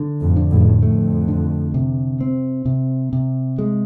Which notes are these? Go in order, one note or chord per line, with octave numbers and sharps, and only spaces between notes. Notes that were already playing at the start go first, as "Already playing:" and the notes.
Already playing: D3
F2 A2
D3
F2 A2
F2 A3
D3
C3
C4
C3
C3
G#3